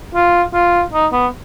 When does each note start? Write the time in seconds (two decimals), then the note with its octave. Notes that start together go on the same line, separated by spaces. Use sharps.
0.15 F4
0.54 F4
0.93 D#4
1.13 B3